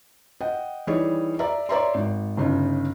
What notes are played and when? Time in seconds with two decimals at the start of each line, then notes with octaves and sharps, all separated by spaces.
0.41 D#5 F#5 G5
0.87 E3 G3 D#4 G#4 C#5
1.39 D5 E5 A#5
1.69 C#5 D5 E5 A#5 C6
1.94 G#1
2.37 G1 C#3 D#4